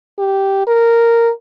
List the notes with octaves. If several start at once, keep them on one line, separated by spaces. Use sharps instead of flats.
G4
A#4